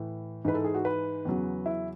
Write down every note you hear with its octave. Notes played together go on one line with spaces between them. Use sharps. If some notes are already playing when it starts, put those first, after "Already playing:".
Already playing: A2 E3
G#2 E3 B4
A4
G#4
F#4
B4
E2 C#3 F#3
E4